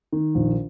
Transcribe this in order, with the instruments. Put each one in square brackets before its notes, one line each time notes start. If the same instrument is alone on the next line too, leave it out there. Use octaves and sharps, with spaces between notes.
[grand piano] D#3
A#1